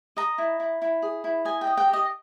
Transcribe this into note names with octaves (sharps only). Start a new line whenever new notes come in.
D#5 A#5
E4
E4
E4
G#4
E4
D#5 G#5
G5
D#5
G5
G4
D#5